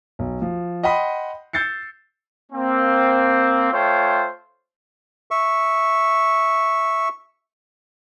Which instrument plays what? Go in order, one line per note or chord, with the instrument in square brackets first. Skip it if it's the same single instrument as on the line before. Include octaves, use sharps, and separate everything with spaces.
[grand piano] B1
F3
D#5 F#5 G5 B5 C6 D#6
E6 G6 A6 C7 C#7
[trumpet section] A#3 C4
A3 F4 C5 C#5 G5
[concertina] E5 C#6